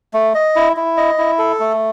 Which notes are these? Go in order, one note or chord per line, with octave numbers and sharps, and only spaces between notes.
A3
D#5
E4
E4
D#5
E4
A4
A3